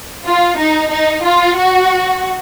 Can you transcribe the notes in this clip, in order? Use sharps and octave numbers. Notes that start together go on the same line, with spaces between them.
F4
D#4
D#4
F4
F#4